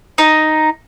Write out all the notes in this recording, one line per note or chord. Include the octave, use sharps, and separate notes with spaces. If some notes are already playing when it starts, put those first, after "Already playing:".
D#4